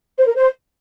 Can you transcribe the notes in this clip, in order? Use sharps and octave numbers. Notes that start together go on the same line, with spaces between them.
C5
A#4
C5